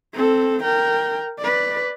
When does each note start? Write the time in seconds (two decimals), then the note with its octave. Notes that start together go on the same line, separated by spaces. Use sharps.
0.13 C4 A4
0.62 A#4 G5
1.39 B4 D5